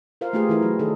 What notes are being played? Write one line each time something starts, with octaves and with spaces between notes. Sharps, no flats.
F4 A#4 C5 F5
A3 B3 F4 G4 G#4
E3 E4 A#4
F#3
D#3 D#4 G#4 A4